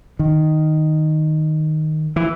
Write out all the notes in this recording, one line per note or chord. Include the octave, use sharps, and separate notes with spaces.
D#3
E3